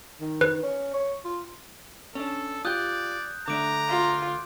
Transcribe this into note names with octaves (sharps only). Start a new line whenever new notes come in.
D#3
B4
C#4
C#5
F4
C#4 D4 A4
F4 G4 D5 D#6 F#6 G6
D3 A3 D4 A#5 D6 D7
F4